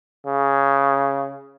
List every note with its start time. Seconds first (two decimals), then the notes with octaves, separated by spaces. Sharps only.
0.27 C#3